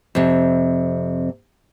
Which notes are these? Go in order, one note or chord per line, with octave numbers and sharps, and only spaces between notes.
F2 C3